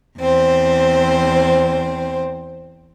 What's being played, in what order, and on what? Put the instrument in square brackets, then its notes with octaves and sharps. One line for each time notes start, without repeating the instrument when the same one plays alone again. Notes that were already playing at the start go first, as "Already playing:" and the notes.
[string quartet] E2 C4 C5